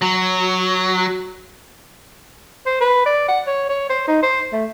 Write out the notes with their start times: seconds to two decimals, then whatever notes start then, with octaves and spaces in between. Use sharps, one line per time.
0.02 F#3
2.66 C5
2.80 B4
3.05 D5
3.28 F#5
3.46 C#5
3.69 C#5
3.89 C5
4.07 D#4
4.22 C5
4.52 A3